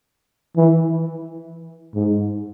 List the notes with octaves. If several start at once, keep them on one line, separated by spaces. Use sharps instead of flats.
E3
G#2